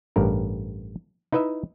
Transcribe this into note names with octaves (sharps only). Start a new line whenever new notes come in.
A1 G2 A#4
D#4 E4 B4 D#5 E5